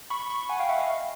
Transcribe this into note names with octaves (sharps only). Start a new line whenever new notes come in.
B5 C#6
B5 C#6
F#5 G#5
F5 G5
E5 F#5
D#5 F5